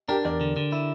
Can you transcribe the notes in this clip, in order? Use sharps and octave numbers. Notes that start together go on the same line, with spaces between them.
D4 G4 A#4
E2 A#4 D5
D3
D3
E4